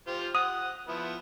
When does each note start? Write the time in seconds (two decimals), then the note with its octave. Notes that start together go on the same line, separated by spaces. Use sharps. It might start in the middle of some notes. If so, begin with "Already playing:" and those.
0.08 F4 G4 C5
0.35 F#5 D#6
0.88 F3 B3 E4